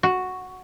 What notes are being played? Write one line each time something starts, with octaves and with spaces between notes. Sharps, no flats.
F#4